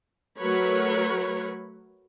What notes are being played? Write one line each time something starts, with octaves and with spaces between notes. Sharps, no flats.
F#3 A3 F#4 A#4 B4 C#5